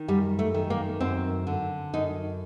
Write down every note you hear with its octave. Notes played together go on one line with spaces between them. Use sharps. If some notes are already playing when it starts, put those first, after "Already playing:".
Already playing: D#3
F#2 G3
A3
D#3
A#3
F#2 C4
D3
F#2 D#4